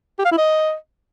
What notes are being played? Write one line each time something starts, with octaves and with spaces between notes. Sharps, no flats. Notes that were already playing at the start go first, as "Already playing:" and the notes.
G4
F5
E4
D#5